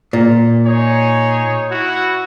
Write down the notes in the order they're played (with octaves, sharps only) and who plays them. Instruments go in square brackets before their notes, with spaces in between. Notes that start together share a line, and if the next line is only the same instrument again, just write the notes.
[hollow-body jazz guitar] A#2
[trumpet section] D#4 G#4 C#5
E4 F#4